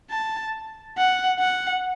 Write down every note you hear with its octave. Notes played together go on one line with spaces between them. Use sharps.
A5
F#5
F#5